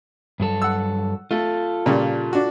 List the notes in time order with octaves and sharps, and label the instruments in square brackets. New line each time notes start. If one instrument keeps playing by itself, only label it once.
[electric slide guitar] G2 F#3 A4
[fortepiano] F#5 E6
[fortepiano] A3 [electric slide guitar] F4 A4
[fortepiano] A#2 C#3 G3
D4 F#4